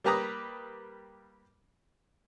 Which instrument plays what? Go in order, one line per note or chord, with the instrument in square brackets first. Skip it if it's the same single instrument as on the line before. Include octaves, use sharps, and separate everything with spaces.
[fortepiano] G3 A#3 G4 B4 A#5 D#6